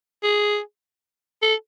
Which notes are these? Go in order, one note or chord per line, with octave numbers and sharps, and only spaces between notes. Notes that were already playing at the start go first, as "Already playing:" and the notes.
G#4
A4